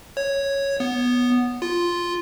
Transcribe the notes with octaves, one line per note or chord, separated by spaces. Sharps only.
C#5
B3
F4